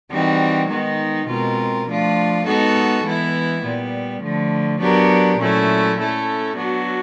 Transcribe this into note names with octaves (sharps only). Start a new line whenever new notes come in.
E3 G3 C4 D#4 F#4
D#3 G#3 B3 D#4
B2 G#3 C4 F4 A#4
F3 A3 D4 F4
G#3 B3 D#4 F#4 A4
E3 G#3 B3 E4
A#2 G3 B3
D3 F3 A3
F#3 B3 D4 G4 A#4
A#2 F#3 A3 C#4 E4
A3 C#4 E4 A4
F#3 B3 D4 F#4